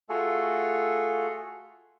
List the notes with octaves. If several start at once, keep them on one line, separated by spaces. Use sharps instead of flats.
A3 F4 F#4 G#4 A4